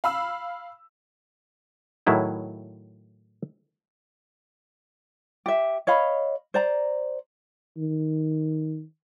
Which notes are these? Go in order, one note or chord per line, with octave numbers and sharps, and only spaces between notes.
F5 B5 E6
A2 D#3 F#3 E4 G#4
G4 E5
C#5 D#5 F5 B5
C5 D5 A#5
D#3